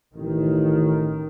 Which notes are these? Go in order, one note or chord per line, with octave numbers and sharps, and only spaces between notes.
A1 D#3